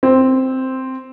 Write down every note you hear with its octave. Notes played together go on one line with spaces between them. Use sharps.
C4